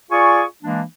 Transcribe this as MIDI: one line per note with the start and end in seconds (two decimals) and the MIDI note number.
0.10 0.42 65
0.10 0.42 68
0.10 0.42 74
0.10 0.42 80
0.10 0.42 85
0.62 0.81 52
0.62 0.81 56
0.62 0.81 58
0.62 0.81 62